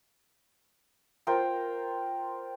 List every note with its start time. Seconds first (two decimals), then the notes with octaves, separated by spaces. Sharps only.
1.27 F4 A#4 C5 G5